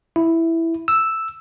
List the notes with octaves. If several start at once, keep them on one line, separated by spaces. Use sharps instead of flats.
E4
E6